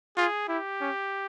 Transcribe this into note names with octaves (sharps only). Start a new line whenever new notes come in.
F4 G#4
E4 G4
C#4